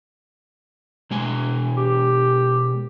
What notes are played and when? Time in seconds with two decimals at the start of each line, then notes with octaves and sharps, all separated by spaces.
1.11 B2 G#3 G#5
1.77 G4